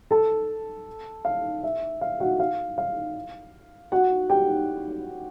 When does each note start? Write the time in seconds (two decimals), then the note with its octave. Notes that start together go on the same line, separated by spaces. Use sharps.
0.11 A4 A5
1.25 F5
1.63 E5
2.01 F5
2.20 F#4 F#5
2.40 F5
2.78 F5
3.92 F#4 F#5
4.29 G4 G5